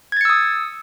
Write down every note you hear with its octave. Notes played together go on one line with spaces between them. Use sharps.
D#6 E6 G#6 A6 C#7